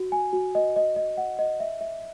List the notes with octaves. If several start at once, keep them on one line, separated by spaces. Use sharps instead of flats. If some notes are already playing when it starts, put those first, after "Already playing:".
Already playing: F#4
G#5
F#4
D#5
D#5
D#5
F#5
D#5
E5
E5